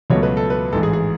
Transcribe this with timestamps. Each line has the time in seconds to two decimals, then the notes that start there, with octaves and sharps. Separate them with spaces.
0.10 C#2 B2 F#3 A3 C#5
0.23 B4
0.37 A4
0.50 B4
0.73 A1 G#2 E3 A4
0.83 G#4
0.93 G#4